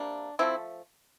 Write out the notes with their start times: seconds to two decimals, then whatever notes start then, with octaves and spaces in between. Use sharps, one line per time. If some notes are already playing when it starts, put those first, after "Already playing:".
Already playing: C3 G3 A#3 D4
0.39 D3 F3 A3 C4 E4